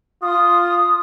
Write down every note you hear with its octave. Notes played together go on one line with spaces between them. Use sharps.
F4 D#6